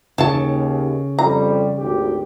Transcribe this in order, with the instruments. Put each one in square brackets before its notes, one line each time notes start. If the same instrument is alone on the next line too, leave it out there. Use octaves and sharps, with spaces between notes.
[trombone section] D#2 [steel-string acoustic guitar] C#3 [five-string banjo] A4 A5
[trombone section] F2 G3 [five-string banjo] A#5
[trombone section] G#1 D2 G4